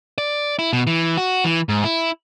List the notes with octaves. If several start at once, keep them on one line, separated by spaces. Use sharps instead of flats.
D5
E4
B2
E3
F#4
E3
G#2
E4